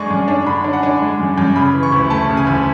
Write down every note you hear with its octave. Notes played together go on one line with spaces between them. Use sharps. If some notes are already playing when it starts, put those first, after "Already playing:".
Already playing: F#2 G#3 D4 D5 G#5 C#6
F#2
D4
D3 B5
D4
F#5
D4 G#5
G#3
F#2
F#2
C#3 B5
E3
C#6
D2
A3 A5
C#3
G#5
D2